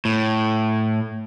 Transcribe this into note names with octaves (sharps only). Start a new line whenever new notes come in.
A2